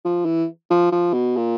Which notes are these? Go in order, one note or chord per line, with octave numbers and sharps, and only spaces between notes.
F3
E3
F3
F3
B2
A#2